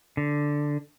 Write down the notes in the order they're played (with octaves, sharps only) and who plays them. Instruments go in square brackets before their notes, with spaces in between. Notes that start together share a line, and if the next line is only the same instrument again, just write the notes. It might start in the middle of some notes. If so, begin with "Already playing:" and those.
[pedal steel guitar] D3